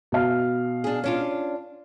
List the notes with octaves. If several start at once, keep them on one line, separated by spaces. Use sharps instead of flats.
B2 F5
D4 G#4
C#4 D4 F4